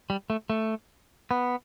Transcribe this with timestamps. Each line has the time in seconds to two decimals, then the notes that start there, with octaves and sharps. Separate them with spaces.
0.10 G3
0.30 A3
0.50 A3
1.31 B3